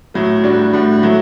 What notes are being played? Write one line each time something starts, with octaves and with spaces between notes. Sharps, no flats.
A2 F#3 A3
A2 G3 D4 F#4
A2 G3 D4 F#4
F#3 A3 E4